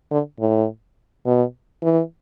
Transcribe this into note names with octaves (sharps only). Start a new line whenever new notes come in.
D3
A2
B2
E3